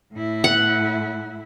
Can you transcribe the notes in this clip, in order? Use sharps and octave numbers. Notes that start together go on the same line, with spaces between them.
A2 E4
F#5